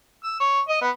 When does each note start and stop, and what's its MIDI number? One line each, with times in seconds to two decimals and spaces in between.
0.24 0.40 88
0.40 0.60 73
0.68 0.79 75
0.81 0.90 59